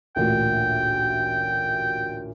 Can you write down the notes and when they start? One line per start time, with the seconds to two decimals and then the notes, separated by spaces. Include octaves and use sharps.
0.16 A1 D2 A#2 G5